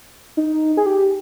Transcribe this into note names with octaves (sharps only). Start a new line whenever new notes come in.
D#4
G#4
G4